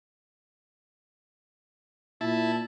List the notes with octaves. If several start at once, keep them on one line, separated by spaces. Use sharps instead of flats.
A#2 E4 A5